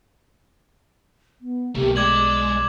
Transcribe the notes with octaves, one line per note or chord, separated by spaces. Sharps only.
B3
B1 A3 A#3 G4
G#3 D5 D6 G#6 F#7